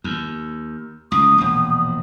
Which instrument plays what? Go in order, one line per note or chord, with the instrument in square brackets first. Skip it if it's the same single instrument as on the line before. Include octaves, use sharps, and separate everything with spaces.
[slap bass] D#2
[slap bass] C#2 [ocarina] D#6
[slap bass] E1 A#1